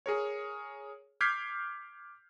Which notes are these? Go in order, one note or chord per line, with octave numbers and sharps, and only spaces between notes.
G#4 A#4 C#5
D6 F6 G6 G#6 B6 C7